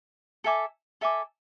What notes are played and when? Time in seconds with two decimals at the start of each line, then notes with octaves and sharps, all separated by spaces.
0.44 A4 E5 G#5 D6
1.01 A4 E5 G#5 D6